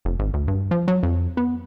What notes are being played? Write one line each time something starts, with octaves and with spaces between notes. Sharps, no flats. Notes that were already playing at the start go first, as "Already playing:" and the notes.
F1
G#1
D2
G2
F3
F#3
F2
B3